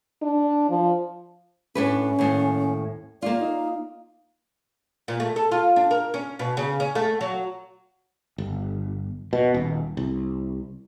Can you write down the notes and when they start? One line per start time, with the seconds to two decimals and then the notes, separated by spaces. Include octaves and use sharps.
0.22 D4
0.70 F3
1.75 A2 C#4 D4 B4
2.19 D#2 A2
3.22 A#3 F4 D5
3.40 D#4
5.08 A#2
5.20 A3
5.36 A4
5.52 F4
5.76 D4
5.91 A#4
6.14 C#4
6.39 B2
6.57 C#3
6.80 C#4
6.95 A3
7.21 F#3
8.38 G1
9.33 B2
9.54 D#1
9.97 C2